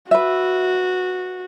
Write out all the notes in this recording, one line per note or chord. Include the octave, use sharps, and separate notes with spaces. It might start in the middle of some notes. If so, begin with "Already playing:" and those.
F#4 B4 E5